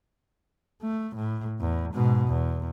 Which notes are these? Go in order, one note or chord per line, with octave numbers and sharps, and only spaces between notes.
A3
A2
E2
G#2 B2
E2